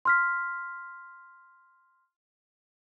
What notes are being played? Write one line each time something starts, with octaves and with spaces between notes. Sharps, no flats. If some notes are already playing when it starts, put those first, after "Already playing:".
C6 F6 B6